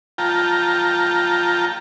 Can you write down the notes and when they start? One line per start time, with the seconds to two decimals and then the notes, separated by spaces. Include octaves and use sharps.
0.18 F4 G5 A5 A#5